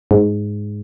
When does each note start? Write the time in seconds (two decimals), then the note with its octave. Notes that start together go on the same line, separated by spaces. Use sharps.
0.11 G#2